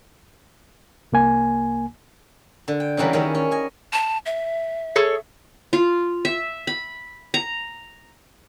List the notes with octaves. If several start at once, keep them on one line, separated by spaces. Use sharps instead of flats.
C2 A#3 G#5
D3
G5
C#3 E3 F#3 G3 A#3 B4
D#3 C#4 E4
C#4
D#5 G#5
A5
E5
G#4 A4 C#5
F4
E5
B5
A#5